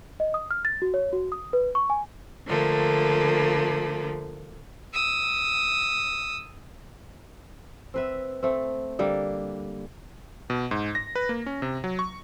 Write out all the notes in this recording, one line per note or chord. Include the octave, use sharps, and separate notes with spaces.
D#5
D#6
F6
A6
F#4
C#5
F#4
D#6
B4
C#6
G#5
D3 F3 A3 A#3
D#6 E6
C4 B4 E5
A3 C4
D3 G3 A#3
B2
G#2
A#6
B4
A#3
C#4
C3
F#3
C#6